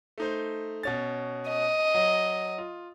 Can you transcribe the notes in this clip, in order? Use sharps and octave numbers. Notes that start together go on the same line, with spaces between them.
A3 D#4 C5
B2 C#4 A6
D#5
F#3
F4